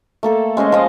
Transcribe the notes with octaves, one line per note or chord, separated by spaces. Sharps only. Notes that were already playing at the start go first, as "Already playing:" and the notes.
A3 A#3 A4
G#3 C#4 C5 D#5
F3 F4 D#5 F5